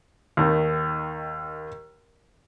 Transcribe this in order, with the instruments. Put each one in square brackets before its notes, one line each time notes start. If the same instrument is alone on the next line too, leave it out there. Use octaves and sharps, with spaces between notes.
[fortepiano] D#2 D#3